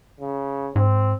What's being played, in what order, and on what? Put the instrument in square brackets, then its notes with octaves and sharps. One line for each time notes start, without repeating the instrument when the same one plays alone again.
[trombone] C#3
[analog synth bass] G#2 [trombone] C4